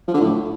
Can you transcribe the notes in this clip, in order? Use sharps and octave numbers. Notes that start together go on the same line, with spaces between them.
F3
D3
A2